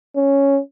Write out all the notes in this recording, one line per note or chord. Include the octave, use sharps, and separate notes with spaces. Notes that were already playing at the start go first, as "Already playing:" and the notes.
C#4